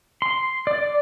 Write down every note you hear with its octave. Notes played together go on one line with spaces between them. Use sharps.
C6
D5